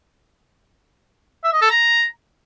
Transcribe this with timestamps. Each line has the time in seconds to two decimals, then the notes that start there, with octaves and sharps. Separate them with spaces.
1.44 E5
1.53 D#5
1.62 A4
1.70 A#5